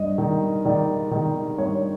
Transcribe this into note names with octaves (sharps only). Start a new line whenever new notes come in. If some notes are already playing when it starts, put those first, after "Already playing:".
Already playing: G2 D#5
D#3
D#3 D5
D#3
G2 C#5